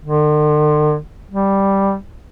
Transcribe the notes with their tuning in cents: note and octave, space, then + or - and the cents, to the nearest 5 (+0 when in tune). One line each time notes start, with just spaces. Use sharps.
D3 +45
G3 +0